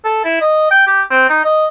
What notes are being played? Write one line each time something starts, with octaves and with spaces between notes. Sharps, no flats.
A4
E4
D#5
G5
G4
C4
D#4
D#5